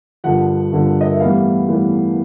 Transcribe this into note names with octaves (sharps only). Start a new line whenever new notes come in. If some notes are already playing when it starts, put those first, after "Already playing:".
G2 D3 F3 F#5
G2 D3 F3
D#5
E5
A2 E3 G3 B3 F5
A2 E3 G3 B3